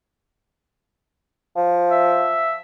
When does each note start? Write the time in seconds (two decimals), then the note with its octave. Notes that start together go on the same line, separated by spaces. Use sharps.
1.57 F3
1.91 E5